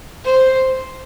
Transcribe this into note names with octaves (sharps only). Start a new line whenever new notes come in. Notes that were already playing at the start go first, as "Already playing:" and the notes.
C5